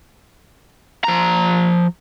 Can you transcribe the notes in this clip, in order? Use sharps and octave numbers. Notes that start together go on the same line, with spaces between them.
F3 A#5